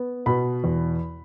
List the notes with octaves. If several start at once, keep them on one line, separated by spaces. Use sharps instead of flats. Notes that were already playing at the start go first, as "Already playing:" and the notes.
Already playing: B3
B2 B5
E2